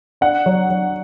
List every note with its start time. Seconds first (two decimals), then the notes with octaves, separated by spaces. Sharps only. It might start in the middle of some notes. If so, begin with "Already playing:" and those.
0.21 D4 F#5
0.46 F#3
0.70 F#3